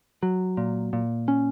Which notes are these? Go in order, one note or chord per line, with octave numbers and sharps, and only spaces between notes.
F#3
A#2
A#2
C#4